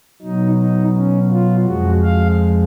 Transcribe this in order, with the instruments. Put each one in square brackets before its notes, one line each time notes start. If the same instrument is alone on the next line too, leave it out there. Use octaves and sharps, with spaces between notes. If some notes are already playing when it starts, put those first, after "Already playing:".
[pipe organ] B2 F#3 D#4
D#4
C#4
F4
F2 F3 G#3 F#4
F5